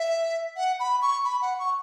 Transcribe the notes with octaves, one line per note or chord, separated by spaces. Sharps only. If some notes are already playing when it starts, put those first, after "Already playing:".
Already playing: E5
F#5
B5
C#6
B5
F#5
C#6